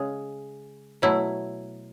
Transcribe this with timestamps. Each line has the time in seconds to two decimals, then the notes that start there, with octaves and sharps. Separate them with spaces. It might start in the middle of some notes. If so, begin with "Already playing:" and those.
Already playing: C#3 G#3 G#4
1.02 B2 F#3 A3 E4